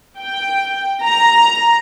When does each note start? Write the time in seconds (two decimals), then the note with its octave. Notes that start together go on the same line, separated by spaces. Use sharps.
0.19 G5
1.03 A#5